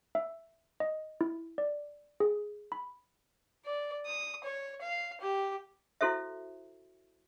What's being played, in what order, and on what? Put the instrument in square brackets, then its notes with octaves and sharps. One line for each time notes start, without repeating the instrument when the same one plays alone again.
[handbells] E5
D#5
E4
D5
G#4
B5
[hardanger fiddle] D5
D#6
C#5
F5
G4
[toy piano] E4 F#4 A4 C5 E5